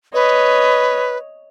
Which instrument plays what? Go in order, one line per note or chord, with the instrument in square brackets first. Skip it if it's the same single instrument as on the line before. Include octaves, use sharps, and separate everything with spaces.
[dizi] B4 [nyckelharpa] C#5 D#5